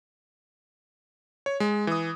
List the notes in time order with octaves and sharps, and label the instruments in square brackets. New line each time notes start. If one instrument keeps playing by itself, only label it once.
[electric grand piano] C#5
G#3
E3 D#6